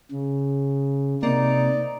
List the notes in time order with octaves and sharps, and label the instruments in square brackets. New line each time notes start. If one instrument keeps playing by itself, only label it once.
[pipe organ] C#3
[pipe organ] C3 [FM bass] A#3 [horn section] D#4 D5